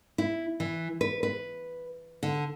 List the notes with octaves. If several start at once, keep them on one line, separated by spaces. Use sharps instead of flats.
E4
E3
B4
B4
D3